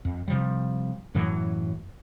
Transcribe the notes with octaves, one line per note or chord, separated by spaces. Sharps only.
F2
C3 F3 G3
F#2 A2 E3 F#3